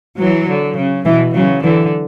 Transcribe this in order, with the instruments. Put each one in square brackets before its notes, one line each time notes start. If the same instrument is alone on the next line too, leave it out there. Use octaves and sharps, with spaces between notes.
[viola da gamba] E3 [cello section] F#3
[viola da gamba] D3
C#3
[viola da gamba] B2 [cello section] E3
[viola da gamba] C#3 [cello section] F#3
[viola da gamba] D3 [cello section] E3